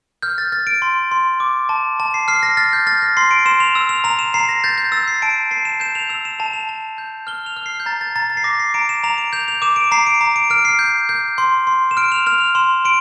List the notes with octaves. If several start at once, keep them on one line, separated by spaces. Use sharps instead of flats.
F6 G6
A6
F6 A6
D7
C6
C6
D6
A5
A5
C7
F6 C7
A#6
F6 A6
G6
F6 A6
A#6
C6 C7
D7
C6 E7
F7
E6
F7
A#5 F7
E7
A#5 C7
A#6
G6 A6
G6
E6 A6
C7
A5 D7
A5 C7
E7
G6 E7
F7
E6 F7
E7
A5 F7
F7
A5
G6
F6 G7
F7
F6
C7
G6
A#5 A6
A6
A#5 A6
A6
C7
D6 A#6
C7
A#5 D7
E7
A#5 F7
D7
G6 F7
F7
D6 E7
D7
A#5 C7
D7
A#5
D7
F6 D7
C7
G6
G6
C6
C6
E7
F6 D7
F7
F6 F7
F7
C6 E7
C6 D7